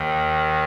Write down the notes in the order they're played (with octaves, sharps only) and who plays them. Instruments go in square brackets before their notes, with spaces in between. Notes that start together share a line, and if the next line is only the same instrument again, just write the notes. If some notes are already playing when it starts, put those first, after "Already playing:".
Already playing: [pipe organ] D#2 D#3